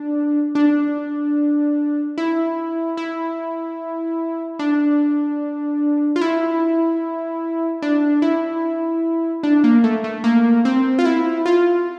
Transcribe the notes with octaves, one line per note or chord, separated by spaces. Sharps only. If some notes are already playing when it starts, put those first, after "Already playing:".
Already playing: D4
D4
E4
E4
D4
F4
E4
D4
E4
D4
A#3
A3
A3
A#3
C4
F4
E4
F4